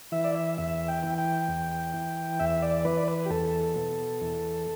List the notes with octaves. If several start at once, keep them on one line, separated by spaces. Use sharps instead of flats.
E3 E5
D5
E5
E2 E5
G5
E3
G5
E2
E3
E2 E5
D5
E3 B4
D5
B4
G4
E2 A4
B2
E2